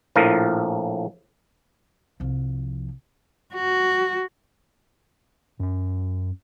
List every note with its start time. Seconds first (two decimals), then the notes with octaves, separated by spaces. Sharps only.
0.16 A#1 A2 F3 A#4
2.20 C2 F3
3.54 F#4
5.60 F#2 C#4